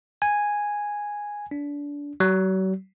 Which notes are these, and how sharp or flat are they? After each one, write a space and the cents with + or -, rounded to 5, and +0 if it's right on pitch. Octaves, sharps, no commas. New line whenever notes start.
G#5 -5
D4 -25
F#3 +40